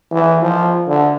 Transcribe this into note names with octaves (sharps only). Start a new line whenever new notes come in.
E3
F3
D3